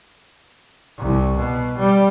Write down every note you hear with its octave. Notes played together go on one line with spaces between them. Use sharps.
C2
B2
G3